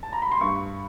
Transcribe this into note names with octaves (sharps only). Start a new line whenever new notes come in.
A5
A#5
B5
C6
G2 C#6